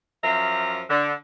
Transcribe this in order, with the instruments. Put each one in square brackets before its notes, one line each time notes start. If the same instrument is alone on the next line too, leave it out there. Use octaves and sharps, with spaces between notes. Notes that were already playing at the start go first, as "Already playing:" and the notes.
[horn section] F#2 F3 E5 A#5
D3